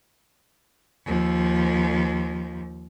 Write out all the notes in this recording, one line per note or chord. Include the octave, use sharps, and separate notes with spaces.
D#2 F3